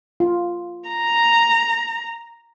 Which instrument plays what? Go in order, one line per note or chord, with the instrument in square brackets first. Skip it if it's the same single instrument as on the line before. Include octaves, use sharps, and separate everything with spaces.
[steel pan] F4
[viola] A#5